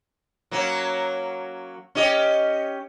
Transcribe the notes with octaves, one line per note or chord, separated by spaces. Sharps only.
F#3 A#3 C#4
C#4 G4 D#5